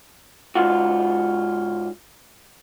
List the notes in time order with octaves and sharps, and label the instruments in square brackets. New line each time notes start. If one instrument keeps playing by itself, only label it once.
[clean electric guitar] G#2 F4 F#4